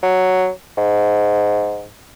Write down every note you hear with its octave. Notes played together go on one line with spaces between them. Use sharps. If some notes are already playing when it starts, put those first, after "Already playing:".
F#3
G#2